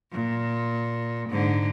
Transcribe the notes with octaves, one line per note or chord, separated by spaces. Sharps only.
A#2
G#2 D3